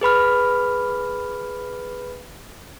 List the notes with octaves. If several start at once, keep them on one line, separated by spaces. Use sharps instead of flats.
G#4 B4 B5 F6